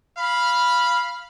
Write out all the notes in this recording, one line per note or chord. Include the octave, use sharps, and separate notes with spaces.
F5 B5